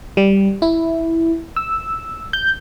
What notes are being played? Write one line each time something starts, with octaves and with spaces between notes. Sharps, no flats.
G3
E4
E6
G6